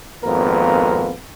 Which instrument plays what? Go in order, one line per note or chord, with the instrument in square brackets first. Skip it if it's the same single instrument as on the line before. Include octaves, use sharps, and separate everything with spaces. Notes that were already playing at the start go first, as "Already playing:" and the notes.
[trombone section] G#1 F2 A#3 B3 A#4